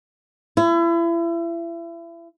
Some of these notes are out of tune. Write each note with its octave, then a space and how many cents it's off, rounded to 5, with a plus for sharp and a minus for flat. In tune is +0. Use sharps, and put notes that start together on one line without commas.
E4 +35